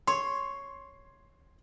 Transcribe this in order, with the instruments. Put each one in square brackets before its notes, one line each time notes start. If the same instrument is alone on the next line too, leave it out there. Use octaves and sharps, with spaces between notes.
[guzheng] C#5 [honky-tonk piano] C6